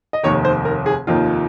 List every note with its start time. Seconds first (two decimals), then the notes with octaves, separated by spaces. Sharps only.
0.13 D#5
0.23 F1 D#2 D#3 C#5
0.45 C5
0.65 A#4
0.86 G#4
1.07 F1 D#2 D#3 F4